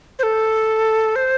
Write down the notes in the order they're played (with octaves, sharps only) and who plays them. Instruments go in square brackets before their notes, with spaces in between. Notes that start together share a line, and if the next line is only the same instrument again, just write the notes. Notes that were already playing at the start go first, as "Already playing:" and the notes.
[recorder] C5
A4
C5